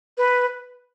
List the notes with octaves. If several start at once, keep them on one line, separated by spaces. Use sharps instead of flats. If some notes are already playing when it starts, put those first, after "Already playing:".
B4